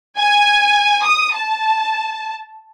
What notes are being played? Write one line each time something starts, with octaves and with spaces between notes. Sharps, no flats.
G#5
D#6
A5